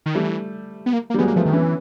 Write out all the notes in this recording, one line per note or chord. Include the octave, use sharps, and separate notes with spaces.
D#3
E3 G3 A3
B3
A#3
A#3
G3
F#3 G#3 B3
A#3
F3 A3 B3
D#3
E3 B3 C#4